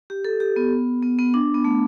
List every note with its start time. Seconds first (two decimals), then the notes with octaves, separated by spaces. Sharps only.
0.10 G4
0.25 A4
0.40 G4
0.56 B3
1.03 B3
1.19 B3
1.34 D4
1.54 B3
1.64 A3